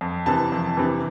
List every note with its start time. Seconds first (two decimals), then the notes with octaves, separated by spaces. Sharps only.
0.01 F2
0.26 C3 E3 A5
0.52 F2
0.77 C3 E3